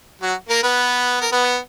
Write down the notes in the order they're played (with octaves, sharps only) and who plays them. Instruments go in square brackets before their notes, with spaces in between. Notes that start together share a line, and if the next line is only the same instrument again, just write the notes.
[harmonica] F#3 F#4
A#3 A#4
B3 B4
A#4
B3 B4